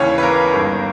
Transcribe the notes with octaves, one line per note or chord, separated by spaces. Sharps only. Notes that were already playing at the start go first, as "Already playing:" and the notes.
Already playing: D#2 C#3 E3 C#4 C#5
B4
A#3 A#4
G1 G2 D#3